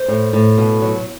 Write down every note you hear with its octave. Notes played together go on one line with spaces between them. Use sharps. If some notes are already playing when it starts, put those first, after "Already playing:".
Already playing: C5
A2
A2
B2
F#3